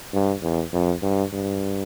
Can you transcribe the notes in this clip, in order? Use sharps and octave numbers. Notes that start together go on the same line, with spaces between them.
G2
E2
F2
G2
G2